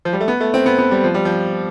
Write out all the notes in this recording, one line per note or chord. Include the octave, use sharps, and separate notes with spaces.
F3
G3
A3
B3
A3
C4
B3
B3
G3
F3
G3
F3